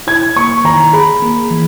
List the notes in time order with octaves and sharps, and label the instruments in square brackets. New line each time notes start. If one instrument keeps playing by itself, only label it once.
[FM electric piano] E4 [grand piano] G#6
[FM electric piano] A#3 [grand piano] C#6
[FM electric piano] D#3 [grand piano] A#5
[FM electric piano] G#4 [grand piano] B5
[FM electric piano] A#3
E3